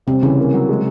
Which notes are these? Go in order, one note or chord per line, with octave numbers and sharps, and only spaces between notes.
C3 G3 C4
C#3 E3 C#4
A#3
F#3
G#3